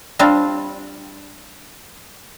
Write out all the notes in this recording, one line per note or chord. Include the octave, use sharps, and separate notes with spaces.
G3 C4 D4 F4 F5